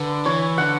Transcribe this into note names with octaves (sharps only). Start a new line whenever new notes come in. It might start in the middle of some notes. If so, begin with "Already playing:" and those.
Already playing: D3 B4
E3 C#5
D3 F#5